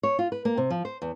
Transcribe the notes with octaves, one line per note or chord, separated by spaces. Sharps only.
C#5
F4
B4
A#3
C3
F3
C5
E2